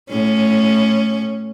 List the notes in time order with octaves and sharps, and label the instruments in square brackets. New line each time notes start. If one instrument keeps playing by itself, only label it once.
[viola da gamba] A2 C#4